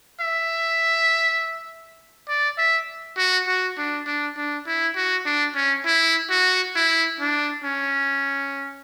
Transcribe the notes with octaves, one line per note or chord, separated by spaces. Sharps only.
E5
D5
E5
F#4
F#4
D4
D4
D4
E4
F#4
D4
C#4
E4
F#4
E4
D4
C#4